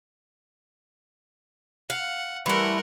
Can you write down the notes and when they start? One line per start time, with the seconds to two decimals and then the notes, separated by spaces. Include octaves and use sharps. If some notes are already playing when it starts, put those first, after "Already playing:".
1.90 F5 F#5
2.46 E3 G3 A3 A#4 F#5 C6